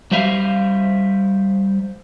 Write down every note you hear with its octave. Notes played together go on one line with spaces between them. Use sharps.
G3 C5 E5 F5